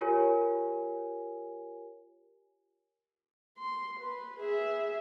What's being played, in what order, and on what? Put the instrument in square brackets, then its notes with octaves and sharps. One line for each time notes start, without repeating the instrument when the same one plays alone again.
[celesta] F4 G4 A#4 C#5 G#5
[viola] C6
B4
G#4 E5